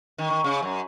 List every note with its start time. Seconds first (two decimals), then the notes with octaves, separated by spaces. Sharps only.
0.18 D#3
0.30 D#3
0.44 C#3
0.63 F#2